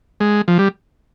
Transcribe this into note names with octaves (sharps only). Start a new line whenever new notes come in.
G#3
F3
G3